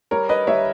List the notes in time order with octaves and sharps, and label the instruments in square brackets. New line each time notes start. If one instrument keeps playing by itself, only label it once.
[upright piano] G3 A#4 C#5
B4 D#5
G3 C#5 E5